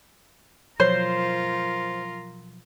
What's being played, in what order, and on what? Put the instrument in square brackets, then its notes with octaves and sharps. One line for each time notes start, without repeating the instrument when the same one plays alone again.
[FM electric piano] B2 F3 F#3 [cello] F4 A#4 [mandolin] C5 [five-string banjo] C#5